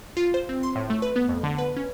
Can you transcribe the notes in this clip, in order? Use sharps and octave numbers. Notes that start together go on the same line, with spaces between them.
F4
C5
C4
C6
A2
A3
B4
B3
F2
D3
B4
C#4